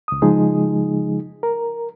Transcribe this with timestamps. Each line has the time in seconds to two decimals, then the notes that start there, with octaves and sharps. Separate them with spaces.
0.08 C#2 D#6
0.22 C#3 F3 G#3 D#4 G#4
1.43 A#4